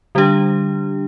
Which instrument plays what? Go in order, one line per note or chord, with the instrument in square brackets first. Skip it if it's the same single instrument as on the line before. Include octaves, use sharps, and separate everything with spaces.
[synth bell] D3 G3 D4 G4